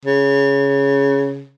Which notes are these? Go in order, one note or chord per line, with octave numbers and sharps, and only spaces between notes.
C#3